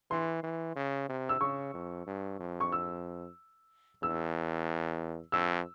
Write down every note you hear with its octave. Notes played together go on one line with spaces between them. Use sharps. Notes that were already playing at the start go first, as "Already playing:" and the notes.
E3 C6
E3
C#3
C3
E6
C#3 C#6
F2
G2
F2
C#6
E6
E2 E6
F2 E6